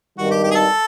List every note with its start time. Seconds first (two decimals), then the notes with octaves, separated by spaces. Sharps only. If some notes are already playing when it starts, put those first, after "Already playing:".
0.18 G#1 G2 D#3 G3 F#4
0.31 G4
0.44 G4
0.51 G#4
0.55 A4